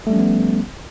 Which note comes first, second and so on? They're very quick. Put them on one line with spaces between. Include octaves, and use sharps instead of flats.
A3 G3 C#4 F3 B3